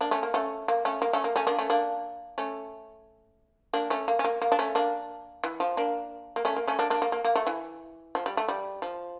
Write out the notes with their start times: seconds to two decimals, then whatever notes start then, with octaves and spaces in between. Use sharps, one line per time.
0.01 A#3 D4
0.11 A3 C#4
0.23 A#3
0.34 A3 C#4
0.68 A#3
0.85 A3 C#4
1.02 A#3
1.13 A3 C#4
1.24 A#3
1.36 A3 C#4
1.47 A#3 D4
1.58 A3 C#4
1.70 A#3 D4
2.38 A3 C#4
3.73 A#3 D4
3.90 A3 C#4
4.08 A#3
4.19 C#4
4.24 A#3
4.42 A#3
4.52 D4
4.59 A3 C#4
4.75 A#3 D4
5.44 E3
5.60 F3
5.77 A#3 D4
6.36 A#3
6.45 A3 C#4
6.56 A#3
6.67 A3 C#4
6.79 A#3 D4
6.90 A#3 D4
7.02 A#3
7.12 A#3
7.25 A#3
7.35 A3
7.47 E3
8.15 F3
8.26 G3
8.37 A3
8.48 G3
8.82 F3